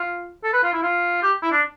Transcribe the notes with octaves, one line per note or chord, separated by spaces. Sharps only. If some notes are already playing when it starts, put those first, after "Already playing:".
Already playing: F4
A4
B4
F4
E4
F4
G4
E4
D4